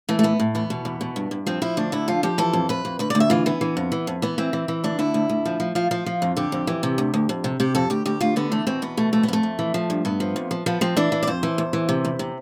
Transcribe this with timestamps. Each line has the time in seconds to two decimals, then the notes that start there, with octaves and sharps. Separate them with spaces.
0.09 E3 A3
0.19 A3
0.24 A2 B3
0.40 A2
0.55 E2 B3
0.70 B2
0.85 E2
1.01 B2
1.16 G2
1.31 G2
1.46 F3 C4
1.62 F3 E4
1.77 D2 D4
1.92 D3 E4
2.08 F3 F4
2.23 F3 G4
2.38 E3 A4
2.53 F2
2.69 F2 B4
2.85 F2
2.99 D2 B4
3.10 D5
3.15 D2
3.20 E5
3.30 E3 F4
3.46 E3 B3
3.61 E3
3.77 F2
3.92 E3
4.07 F2
4.22 E3 B3
4.38 E3 C4
4.53 E3
4.68 E3
4.84 D2 D4
4.99 D3 E4
5.14 D2
5.29 D2
5.45 F3
5.60 F3
5.75 F3 F4
5.91 F3 F4
6.06 F3
6.22 F2
6.37 D3 G4
6.52 F2
6.67 E3
6.83 C3
6.98 D2
7.14 D2
7.29 F2
7.44 C3
7.60 C3 G4
7.75 F2 A4
7.90 D2 G4
8.05 D2 G4
8.21 D2 F4
8.36 D3 B3
8.52 E2 A3
8.67 B2 C4
8.82 E2 B3
8.97 B2 A3
9.13 F2 A3
9.23 B3
9.28 F2 A3
9.43 F2
9.59 E3
9.74 F3
9.90 G2
10.05 G2 B3
10.20 F3
10.36 F2
10.51 F3
10.66 F3 B3
10.81 F3 C4
10.97 E3 D4
11.12 E3
11.23 D5
11.27 F2 C5
11.43 E3
11.58 E2
11.73 E3
11.89 C3
12.05 E2
12.19 C3